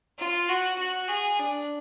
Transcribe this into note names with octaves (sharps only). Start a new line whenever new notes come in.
F4
F#4
F#4
G#4
D4